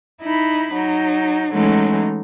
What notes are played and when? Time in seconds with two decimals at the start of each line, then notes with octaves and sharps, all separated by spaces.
0.23 D#4 E4 B5
0.73 F#3 D#4
1.53 E3 F#3 G#3 A3 C#4 D#4